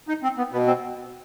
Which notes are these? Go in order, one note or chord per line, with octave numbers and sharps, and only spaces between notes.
D#4
C4
B3
B2 B3
C4